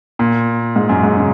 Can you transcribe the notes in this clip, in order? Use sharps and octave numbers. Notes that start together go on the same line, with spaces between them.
A#2
G#2
F#2
G#2
C#3